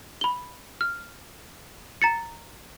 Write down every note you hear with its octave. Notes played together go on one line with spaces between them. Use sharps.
B5 G7
F6
A#5 A6 C#7